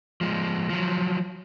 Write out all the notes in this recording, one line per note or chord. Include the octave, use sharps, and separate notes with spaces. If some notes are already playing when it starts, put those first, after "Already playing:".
F3 G#3
F3 F#3